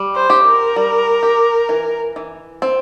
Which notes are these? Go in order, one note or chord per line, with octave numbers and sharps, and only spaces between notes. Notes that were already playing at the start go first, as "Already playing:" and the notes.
Already playing: G3
C5
G4
A#4
G3
G4
E3
E3
C4